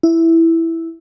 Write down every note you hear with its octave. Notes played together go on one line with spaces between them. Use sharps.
E4